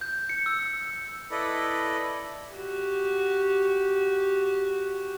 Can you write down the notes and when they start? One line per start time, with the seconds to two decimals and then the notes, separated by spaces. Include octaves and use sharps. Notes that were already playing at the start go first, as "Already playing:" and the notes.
0.01 G6
0.29 C#7
0.46 E6
1.31 E4 A4 B4 D5 D#5
2.53 F#4 G4